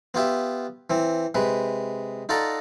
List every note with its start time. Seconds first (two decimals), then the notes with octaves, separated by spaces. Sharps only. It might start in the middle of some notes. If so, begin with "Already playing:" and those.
0.14 B3 F4 G4 E5
0.90 E3 C4
1.35 C3 G#3 B4
2.29 D#4 F4 A4 D5 F#5 A#5